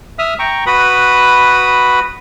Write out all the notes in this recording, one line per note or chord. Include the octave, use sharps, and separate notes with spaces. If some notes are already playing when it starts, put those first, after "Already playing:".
E5 D#6 F6
G5 A#5 C#6
F#4 B4 B5 D#6